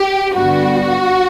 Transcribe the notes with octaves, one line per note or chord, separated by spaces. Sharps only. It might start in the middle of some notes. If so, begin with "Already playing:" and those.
Already playing: G4
G2 D3 G3 B3 F#4